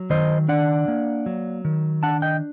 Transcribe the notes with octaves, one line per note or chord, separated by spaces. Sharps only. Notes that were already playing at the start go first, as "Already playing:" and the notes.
Already playing: F#3
D#3 C5 D#5
D4 D5 F#5
A#3
F#3
D#3
D4 F#5 A5
D#5 G5